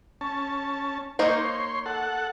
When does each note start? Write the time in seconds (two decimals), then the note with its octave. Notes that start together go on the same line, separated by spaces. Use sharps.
0.21 C#4 A5
1.19 A#3 D#4 C5 C#5 C6
1.86 A4 F#5